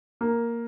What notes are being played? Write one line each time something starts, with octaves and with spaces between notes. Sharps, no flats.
A#3